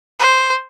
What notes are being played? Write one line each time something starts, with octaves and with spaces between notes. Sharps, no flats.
C5